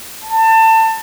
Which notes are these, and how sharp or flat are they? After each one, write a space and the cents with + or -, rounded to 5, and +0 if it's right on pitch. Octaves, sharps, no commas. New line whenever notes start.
A5 +25